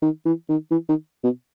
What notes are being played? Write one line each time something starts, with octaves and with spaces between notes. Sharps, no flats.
D#3
E3
D#3
E3
D#3
B2